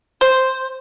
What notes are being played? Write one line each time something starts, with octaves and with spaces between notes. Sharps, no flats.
C5